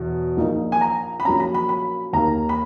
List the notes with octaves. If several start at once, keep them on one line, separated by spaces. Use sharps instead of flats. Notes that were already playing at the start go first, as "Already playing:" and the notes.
Already playing: E2 B2 F#3 E4
A#1 A#2 A#3 D#4
G#5
A#5
B5
A#1 A#2 F#3 A#3 C#4 A#5
B5
B5
B5
D#2 D#3 A#3 A#5
B5